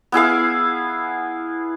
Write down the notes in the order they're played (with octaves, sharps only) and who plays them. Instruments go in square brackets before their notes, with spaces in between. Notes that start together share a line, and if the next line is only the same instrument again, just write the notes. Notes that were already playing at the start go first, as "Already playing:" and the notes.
[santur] B3 E4 G#4 F5